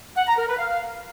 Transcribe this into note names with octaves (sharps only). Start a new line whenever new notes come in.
F#5
A#5
A#4
B4
F5